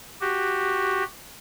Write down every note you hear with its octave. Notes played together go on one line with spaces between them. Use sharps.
F#4 G4